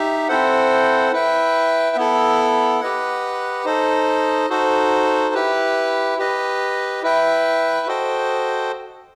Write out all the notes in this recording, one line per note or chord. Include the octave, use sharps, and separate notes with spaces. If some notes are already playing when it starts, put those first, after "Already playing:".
Already playing: D#4 G4 E5
C4 E4 A4 C5 F#5
E4 B4 E5 G5
B3 E4 A4
G4 B4 D#5 F#5
D#4 A4 C5 D#5
D#4 F#4 A4 C5
E4 G4 B4
G4 B4 D#5
E4 B4 E5 G5
F#4 A4 C5 D#5 G5